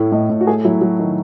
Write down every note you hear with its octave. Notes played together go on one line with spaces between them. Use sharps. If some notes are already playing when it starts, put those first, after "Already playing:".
Already playing: A2 A3 E4
A2 D#5
A2
F#4
A3 G#4
F#3 E4
F#3
D#3 D#4